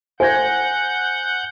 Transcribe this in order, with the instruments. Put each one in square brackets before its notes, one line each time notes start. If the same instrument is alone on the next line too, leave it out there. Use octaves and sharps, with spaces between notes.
[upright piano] C5 G#6 [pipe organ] F#5 G6 [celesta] G#5 A#6